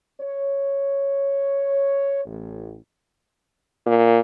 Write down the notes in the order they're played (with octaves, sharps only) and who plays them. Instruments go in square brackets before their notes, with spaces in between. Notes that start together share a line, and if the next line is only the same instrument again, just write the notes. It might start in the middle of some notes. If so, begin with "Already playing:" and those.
[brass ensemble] C#5
A1
[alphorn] A#2